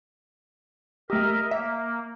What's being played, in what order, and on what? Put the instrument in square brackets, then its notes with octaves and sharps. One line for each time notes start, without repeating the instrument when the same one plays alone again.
[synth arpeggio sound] A3 G4 [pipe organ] A#4 D#5 E5
[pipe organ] A#3 [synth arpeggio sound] E5